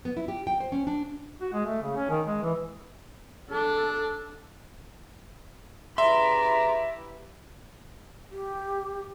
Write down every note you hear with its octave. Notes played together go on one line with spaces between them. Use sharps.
B3
E4
G4
G5
C5
C#4
D4
F#4
G#3
A3
C#3
C#4
D#3
G#3
E3
D4 A4
C#3 E4 G4 B4 D5 E5 A#5 C6
G4